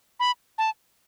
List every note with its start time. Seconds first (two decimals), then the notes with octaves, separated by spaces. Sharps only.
0.20 B5
0.58 A5